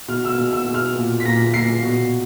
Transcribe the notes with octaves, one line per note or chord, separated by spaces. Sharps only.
B2 F6
E6
F6
B2
E6
B2
F6
A#2
B6
A#2 A#6
A#2 C7
B2